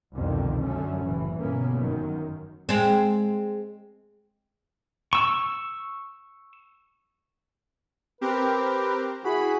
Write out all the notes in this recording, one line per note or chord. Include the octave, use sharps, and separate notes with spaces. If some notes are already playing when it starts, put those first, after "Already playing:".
C2 F2 B2 D3 D#3
F#2 D3 F#3 A3 C#4
F#1 A2 E3
G1 B2 A#3 B3 C#4
F#2 D#3 F#3
G#3 C4
C#6 E6
C4 G4 A#4 B4
E4 F#4 G#4 B5